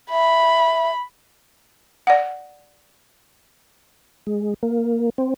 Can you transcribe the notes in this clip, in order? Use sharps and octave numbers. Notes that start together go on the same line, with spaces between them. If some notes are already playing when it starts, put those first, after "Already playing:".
E5 B5
D5 F#5
G#3
A#3
C4